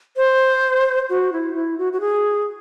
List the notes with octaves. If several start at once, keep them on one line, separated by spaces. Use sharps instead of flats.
C5
F#4
E4
E4
F#4
F#4
G#4